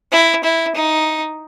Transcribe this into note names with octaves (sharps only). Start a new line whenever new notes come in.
E4
E4
D#4